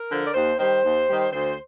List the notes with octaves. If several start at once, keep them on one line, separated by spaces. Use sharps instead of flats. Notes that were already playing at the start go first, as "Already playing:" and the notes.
Already playing: A#4
D3 F3
D5
D#2 C5
D#3 G3 C5
D#2
D#3 G3
D2 C5